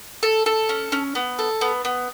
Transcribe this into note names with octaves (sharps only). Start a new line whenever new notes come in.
A4
A4
C#4
C#4
B3
A4
B3
B3